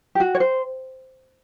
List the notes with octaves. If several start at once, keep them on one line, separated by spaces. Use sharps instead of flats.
G4
F#4
C#5
C5